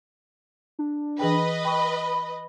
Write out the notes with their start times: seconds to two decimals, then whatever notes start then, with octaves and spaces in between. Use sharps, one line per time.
0.79 D4
1.19 E3 G#4 B4 D#5 G5
1.65 G5 B5 C#6